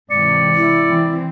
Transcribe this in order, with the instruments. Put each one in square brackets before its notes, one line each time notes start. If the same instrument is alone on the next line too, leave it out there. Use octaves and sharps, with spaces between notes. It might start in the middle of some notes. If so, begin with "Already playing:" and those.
[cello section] G#2 C3 E3 [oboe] D5 [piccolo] C#7
[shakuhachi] E4
[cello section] E3 C4